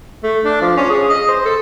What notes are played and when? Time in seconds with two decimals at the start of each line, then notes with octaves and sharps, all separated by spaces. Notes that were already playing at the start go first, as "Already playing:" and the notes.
0.24 A3
0.45 D4
0.62 F3
0.77 C#4
0.90 G#4
1.10 D#5
1.29 C5
1.45 A4